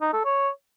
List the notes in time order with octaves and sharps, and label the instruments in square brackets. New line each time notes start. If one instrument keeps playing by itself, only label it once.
[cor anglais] D#4
A4
C#5